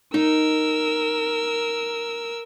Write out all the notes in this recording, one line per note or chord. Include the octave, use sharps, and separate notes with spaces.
D#4 A#4 E6